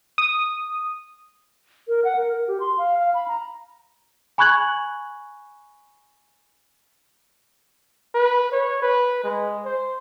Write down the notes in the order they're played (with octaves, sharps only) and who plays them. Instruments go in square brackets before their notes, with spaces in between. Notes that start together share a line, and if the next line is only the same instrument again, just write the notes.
[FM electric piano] D#6
[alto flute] A#4
F#5
A#4
A#4
G4
C6
F5
F5
B5
A#5
[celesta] G#5 B5 C#6 F#6 G#6 F#7
[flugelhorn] B4
C#5
B4
G#3
C5